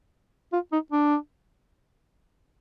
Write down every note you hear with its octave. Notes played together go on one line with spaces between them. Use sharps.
F4
D#4
D4